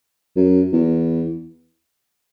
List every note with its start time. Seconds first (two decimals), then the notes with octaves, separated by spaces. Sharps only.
0.36 F#2
0.73 E2